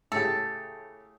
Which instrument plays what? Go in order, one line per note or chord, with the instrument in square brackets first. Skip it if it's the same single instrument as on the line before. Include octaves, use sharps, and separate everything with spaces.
[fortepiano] A2 C#3 G4 [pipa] A4